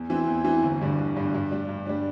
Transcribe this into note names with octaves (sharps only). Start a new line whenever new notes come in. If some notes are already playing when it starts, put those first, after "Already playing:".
Already playing: E2
E3 C4 E4
E2
E3 C4 E4
G1
G2 D3 G3
G1
G2 D3 G3
G2
G3 D4
G2
G3 D4